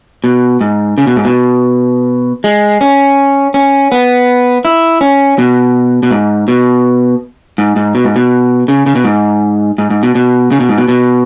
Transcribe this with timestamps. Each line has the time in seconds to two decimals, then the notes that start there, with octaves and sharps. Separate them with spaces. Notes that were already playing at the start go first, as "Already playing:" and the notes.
0.24 B2
0.61 G#2
0.98 C#3
1.07 B2
1.16 G#2
1.25 B2
2.44 G#3
2.81 C#4
3.54 C#4
3.92 B3
4.65 E4
5.01 C#4
5.38 B2
6.03 B2
6.11 G#2
6.48 B2
7.58 G#2
7.76 G#2
7.95 B2
8.04 G#2
8.16 B2
8.68 C#3
8.86 C#3
8.95 B2
9.04 G#2
9.78 G#2
9.90 G#2
10.03 B2
10.15 B2
10.52 C#3
10.60 B2
10.69 G#2
10.78 B2
10.88 B2